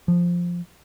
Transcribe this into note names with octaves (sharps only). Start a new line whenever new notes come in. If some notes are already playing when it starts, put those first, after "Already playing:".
F3